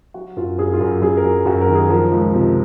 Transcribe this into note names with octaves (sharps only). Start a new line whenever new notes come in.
F#3 F#4
F#2 F4
F#2 G#4
F4
F#2
F#2 G#4
A#4
F#3
F#2 F#4
A#4
D#3
G#4
F3 A#4
C#2
C3